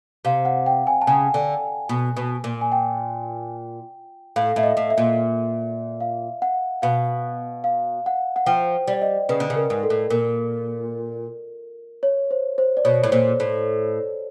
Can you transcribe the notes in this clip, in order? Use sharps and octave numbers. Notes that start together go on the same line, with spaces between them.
C3 F5
F#5
G5
G#5
A5
C#3 G#5
D3
B2
B2
A#2
G#5
G5
A2 F5
A2 E5
D#5
A2
E5
A#2
F5
F#5
B2 F5
F5
F#5
F#5
F3 G5
G3
D5
D#5
C#3 B4
D3
C#3
A#4
G#2
A4
A2
A#2 A#4
C#5
C5
C5
D5
B2 C#5
A2
A#2 C5
A2